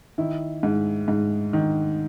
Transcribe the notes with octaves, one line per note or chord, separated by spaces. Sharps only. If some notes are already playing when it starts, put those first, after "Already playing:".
D#3 E4
G#2
G#2
D#3